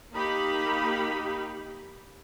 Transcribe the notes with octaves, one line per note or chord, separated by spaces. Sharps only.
A#3 D#4 G4 B5